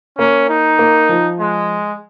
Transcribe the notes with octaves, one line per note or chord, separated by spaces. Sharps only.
A#3 C#4
D#4
A#3
F3
G#3